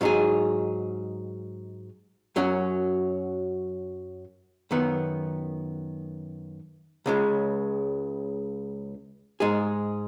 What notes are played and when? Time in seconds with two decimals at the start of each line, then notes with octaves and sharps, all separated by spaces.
0.01 G#2 F#3 D#4 G#4
2.36 F#2 F#3 C#4 F#4
4.71 F#2 D#3 B3
7.06 C#2 C#3 G#3
9.40 G#2 G#3 D#4 G#4